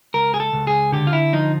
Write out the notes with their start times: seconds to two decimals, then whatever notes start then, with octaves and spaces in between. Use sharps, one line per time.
0.14 C#2 A#4
0.34 G#4
0.40 A4
0.53 C#2
0.67 G#4
0.92 D3 G4
1.07 F4
1.13 E4
1.33 F3 D#4